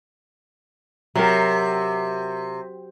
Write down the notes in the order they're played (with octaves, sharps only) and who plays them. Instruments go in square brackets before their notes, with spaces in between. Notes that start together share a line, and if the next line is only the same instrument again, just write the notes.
[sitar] C3 [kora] F#3 A#4